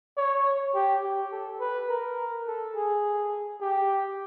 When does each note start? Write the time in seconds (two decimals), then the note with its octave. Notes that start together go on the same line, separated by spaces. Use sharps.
0.17 C#5
0.75 G4
1.04 G4
1.32 A4
1.60 B4
1.89 A#4
2.47 A4
2.76 G#4
3.61 G4